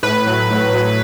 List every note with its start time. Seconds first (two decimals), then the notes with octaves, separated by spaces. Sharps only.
0.03 A2 B4
0.27 F#3
0.50 A2
0.73 F#3